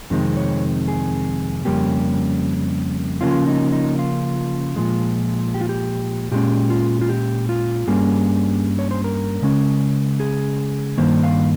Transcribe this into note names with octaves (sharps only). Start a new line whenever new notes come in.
F2 C3 D#3 G#3 C4
C#5
G#4
F2 C#3 G3 A#3 C#4 G4
C#3 F3 A#3 C#4 F4
D#4
D#4
F4
A#2 F3 G#3
G4
F4
G4
A#2 G#3 C#4 G4
F4
F4
G4
F4
G2 G3 A#3 C#4 G#4
C#5
C5
A#4
C#3 G#3 C#4
G#4
G2 D#3 A#3 C5
F5